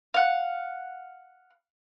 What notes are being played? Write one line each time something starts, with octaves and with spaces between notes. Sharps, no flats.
F5 F#5